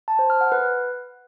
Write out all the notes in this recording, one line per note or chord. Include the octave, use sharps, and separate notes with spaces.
A5
C5
F6
F#5
B4